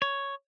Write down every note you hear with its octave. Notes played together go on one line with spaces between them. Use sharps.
C#5